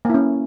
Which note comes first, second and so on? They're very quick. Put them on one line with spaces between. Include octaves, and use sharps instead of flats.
A#3 E4 C#4